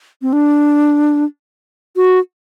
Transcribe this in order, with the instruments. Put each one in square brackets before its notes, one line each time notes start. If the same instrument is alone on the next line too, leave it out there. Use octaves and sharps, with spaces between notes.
[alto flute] C4
D4
F#4